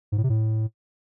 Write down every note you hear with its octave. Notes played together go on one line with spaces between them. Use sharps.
G#2
A2
C3
A2